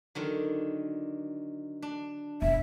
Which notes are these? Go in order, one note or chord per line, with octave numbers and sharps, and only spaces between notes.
D3 D#3 F#3
D4
E1 F2 E5